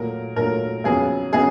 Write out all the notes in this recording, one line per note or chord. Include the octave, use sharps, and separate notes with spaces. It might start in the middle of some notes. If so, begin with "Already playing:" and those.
Already playing: A#2 F#3 A3 A#4
A#2 F#3 A3 A#4
F2 C#3 F#3 B3 G#4
C#3 F#3 B3 G#4